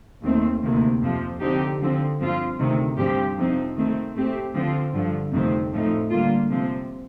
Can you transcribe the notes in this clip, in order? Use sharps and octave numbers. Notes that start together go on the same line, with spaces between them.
D#2 D#3 A3 C4
D2 C3 D#3 A#3
F2 C3 F3
D3 F3 C4 D#4 G4
D3 F3 C4
G2 F3 C4 F4
D2 C3 D#3
G2 F3 C4 G4
F2 C3 F3 C4 D#4
D#3 A3 C4
A2 A3 C4 G4
D3 F3 C4 F4
G2 D3 F3
F2 C3 D#3 A3 C4
A2 F3 A3 D#4
D3 G3 A#3 F4
C3 F3 C4